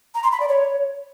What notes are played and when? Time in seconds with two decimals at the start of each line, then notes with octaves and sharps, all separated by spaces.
0.15 A#5
0.23 C6
0.32 B5
0.40 D5
0.49 C#5